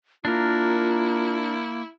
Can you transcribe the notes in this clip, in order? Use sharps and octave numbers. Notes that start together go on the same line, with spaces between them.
A#3 D4 E4 F4 A#4